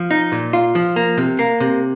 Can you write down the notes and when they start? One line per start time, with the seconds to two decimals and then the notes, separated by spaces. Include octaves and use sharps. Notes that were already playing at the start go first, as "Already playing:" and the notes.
Already playing: F3
0.11 D#4
0.32 A#2
0.53 F4
0.75 F3
0.96 A#3
1.18 C3
1.39 A#3
1.60 C3